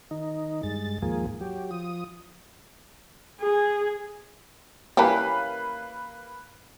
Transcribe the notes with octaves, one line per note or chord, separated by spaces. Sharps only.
D#3 D#4
G2 G#3 A6
D#2 G#2 F3 A#3 G#4
F#3 G4
F3 D#6
G#4
E3 A#3 C#4 G4 B4 F5